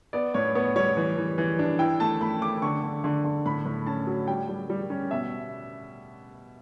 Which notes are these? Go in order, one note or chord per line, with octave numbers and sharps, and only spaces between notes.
B3 D5
A2 C#5
B3 C#5
G3 C#5
E3
E3
E3
D4
E4 G5
A3 A5
A3 B5
A3 D6
D3 C#6
D3
D3
D3
A2 B5
A2
C#4 A5
F#3
G3 G5
G3
G3
C#4
B2 E5